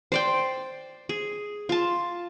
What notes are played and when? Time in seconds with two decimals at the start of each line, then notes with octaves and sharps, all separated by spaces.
0.12 C5 D5 G5
1.09 G#4
1.69 F4 A5